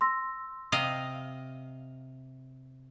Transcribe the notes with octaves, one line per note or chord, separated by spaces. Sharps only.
C6 E6 A#6
C3 D#5 F5